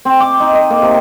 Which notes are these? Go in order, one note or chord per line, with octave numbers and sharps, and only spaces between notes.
C4
D6
D#4
D#5
A#3
C3